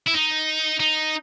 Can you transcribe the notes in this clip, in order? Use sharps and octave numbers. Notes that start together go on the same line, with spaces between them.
E4
D#4
D#4